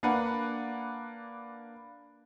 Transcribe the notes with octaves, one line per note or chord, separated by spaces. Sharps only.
A#3 D4 B4 F#5